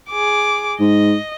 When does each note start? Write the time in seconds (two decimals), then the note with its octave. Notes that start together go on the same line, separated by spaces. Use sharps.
0.10 G#4 D6
0.80 G#2 D#5